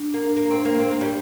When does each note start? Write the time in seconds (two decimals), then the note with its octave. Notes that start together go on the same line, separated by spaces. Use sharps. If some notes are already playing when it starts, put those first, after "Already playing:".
Already playing: D4
0.14 A#3
0.37 A#3
0.51 C4
0.65 A#3
0.79 C4
0.91 A#3
1.01 G3